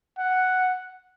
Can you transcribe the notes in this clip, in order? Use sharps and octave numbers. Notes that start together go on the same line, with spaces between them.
F#5